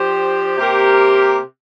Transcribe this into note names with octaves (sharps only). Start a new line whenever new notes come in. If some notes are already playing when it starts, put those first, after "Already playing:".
Already playing: F3 D4 G4 C5
C3 A#3 G4 A#4